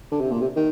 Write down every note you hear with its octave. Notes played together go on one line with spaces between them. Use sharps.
D3
C3
A#2
C3
D#3